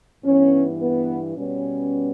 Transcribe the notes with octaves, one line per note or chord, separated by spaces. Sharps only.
G2 E3 B3 C#4
B3
B2 G3 B3 C#4